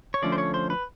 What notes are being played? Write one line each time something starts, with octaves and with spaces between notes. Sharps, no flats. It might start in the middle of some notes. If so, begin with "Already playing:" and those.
C#5
D3 F3 A3 C#4 D5
C5
C#5
C5
B4